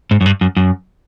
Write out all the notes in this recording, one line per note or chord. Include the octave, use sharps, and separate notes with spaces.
G#2
F#2
G2
F#2
F#2